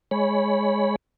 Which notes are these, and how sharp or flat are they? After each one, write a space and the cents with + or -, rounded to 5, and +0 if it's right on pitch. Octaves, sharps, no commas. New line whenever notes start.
G#3 +0 C#5 +0 B5 +0